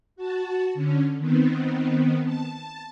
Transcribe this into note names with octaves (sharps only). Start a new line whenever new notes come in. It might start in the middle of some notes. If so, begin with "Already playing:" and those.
F#4 A5
D3 C#4
D#3 B3 C4
A5